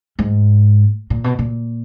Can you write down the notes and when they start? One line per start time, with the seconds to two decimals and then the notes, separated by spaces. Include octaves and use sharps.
0.19 G#2
1.10 A#2
1.24 B2
1.39 A#2